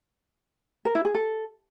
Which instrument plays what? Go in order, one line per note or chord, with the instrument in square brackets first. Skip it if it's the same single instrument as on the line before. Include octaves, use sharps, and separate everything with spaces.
[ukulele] A#4
E4
G#4
A4